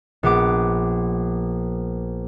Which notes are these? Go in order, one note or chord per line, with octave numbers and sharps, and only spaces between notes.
A#1 B3 D6